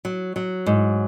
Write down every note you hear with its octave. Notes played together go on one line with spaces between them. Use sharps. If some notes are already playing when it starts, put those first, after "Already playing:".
F#3
F#3
G#2